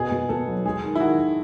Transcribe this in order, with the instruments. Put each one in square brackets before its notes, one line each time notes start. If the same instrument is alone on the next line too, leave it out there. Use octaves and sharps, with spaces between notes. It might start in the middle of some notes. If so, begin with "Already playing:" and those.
Already playing: [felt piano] B2 [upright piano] G#4
[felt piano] B2
[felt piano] B2 [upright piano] A4
[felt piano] F#3
[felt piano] G#3 [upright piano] G#4
[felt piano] D#3
[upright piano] E4
[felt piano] D#3 [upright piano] F#4
[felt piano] D#3